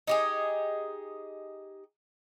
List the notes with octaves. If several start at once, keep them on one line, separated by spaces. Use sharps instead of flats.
D#4 G4 G#4